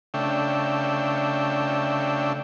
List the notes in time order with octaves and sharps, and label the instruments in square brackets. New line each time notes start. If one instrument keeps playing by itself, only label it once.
[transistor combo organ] C#3 A3 D4 E5 G5